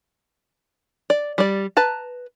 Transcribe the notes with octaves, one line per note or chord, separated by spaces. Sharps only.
D5
G3 D5
B4 A5 A#5